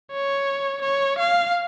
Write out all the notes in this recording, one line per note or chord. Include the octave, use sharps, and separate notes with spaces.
C#5
C#5
F5